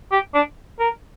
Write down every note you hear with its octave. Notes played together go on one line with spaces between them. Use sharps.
G4
D4
A#4